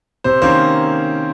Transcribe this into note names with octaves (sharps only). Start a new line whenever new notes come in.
C3 C5
D#3 A#3 C#4 C5